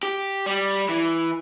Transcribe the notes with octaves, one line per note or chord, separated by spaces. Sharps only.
G4
G3
E3